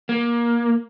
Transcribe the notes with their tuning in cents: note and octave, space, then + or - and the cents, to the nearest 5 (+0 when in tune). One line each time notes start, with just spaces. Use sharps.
A#3 +20